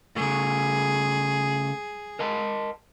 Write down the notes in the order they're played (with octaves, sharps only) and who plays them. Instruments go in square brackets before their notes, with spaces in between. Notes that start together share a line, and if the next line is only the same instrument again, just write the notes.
[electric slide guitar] C#3 A3 [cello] G#4
[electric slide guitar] A#4 D#5 A5